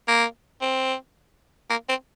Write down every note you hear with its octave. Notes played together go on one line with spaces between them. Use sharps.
A#3
C4
A#3
C4